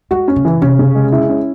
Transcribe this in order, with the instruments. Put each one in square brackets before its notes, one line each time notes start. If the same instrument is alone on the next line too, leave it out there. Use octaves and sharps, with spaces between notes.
[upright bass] G#3 [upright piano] F#4
[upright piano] C#4
[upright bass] C#3
[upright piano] E3
[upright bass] C3 [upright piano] C#4
[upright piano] C#3
G#3
E4
C#4